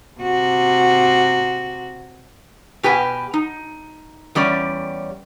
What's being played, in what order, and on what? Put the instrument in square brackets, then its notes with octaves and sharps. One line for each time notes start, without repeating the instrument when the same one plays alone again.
[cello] C3 F#4
[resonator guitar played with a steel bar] B2 G4 B4 G#5
D#4
E2 G3 C#4 D5